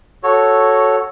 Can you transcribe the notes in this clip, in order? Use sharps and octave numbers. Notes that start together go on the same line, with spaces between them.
F#4 A4 C#5